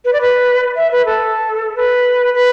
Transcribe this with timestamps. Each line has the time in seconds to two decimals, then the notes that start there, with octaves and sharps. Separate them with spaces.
0.05 B4
0.13 D5
0.21 B4
0.76 E5
0.92 B4
1.05 A4
1.76 B4
2.34 B4